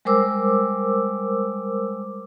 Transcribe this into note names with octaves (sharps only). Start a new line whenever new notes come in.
G3 G#3 A#4 C5 D6 E6